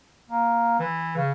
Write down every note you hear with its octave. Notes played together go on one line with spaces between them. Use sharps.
A#3
E3
C#3